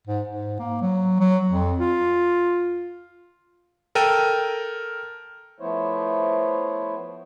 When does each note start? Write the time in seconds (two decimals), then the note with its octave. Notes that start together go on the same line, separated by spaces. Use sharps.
0.07 G#2
0.28 G#2
0.60 A#3
0.82 F#3
1.20 F#3
1.49 F2
1.80 F4
3.95 A4 A#4 G5 D#7
5.60 F3 A3 B3 E4 C5 C#5